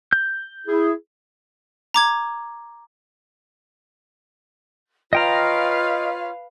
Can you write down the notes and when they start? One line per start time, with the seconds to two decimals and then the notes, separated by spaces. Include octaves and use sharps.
0.13 G6
0.67 E4 G#4
1.94 A#5 D6 G#6
5.13 F4 B4 C#5 D#5 F5 G5 A#5 F6